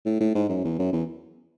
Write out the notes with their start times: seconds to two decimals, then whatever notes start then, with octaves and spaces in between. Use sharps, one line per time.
0.06 A2
0.20 A2
0.35 G#2
0.49 F#2
0.64 E2
0.79 F#2
0.93 E2